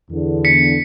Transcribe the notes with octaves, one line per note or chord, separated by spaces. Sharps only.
E2 D3
B6 C#7